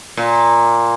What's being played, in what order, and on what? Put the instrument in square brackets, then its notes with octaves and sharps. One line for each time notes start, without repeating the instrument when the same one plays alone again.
[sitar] A#2